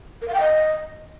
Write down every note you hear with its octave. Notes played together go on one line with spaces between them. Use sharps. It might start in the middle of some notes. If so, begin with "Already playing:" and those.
A#4
F5
G5
D#5